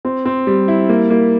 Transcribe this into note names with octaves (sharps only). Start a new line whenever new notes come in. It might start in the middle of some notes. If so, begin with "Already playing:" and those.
C4
C4
G3
E4
A#3
A#3